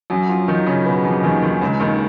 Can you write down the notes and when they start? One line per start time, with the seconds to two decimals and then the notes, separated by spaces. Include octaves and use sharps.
0.10 F#2 F#3
0.29 F3 F4
0.48 D#3 D#4
0.66 C#3 C#4
0.86 B2 B3
1.04 F2 F3
1.23 D#2 D#3
1.42 D#2 D#3
1.61 C#2 C#3
1.80 D#2 D#3